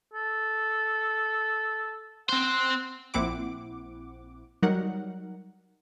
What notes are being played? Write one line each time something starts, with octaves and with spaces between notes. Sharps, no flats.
A4
C4 C5 F#5
A#1 A#2 C4 E4 F#5 D6
F#3 G3 D#4 A#4 F#5